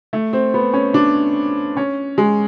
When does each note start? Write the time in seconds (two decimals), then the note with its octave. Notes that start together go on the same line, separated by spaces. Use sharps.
0.13 A3
0.33 C4
0.54 B3
0.73 C#4
0.94 D4
1.77 C#4
2.18 G#3